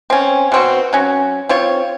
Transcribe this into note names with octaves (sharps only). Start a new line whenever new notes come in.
C4 C#4
B2 C4 F#4
F#3 C#4
C4 F4 C#5